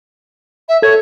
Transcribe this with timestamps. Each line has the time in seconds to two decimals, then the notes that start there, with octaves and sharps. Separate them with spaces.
0.68 E5
0.82 A4 C#5 G#6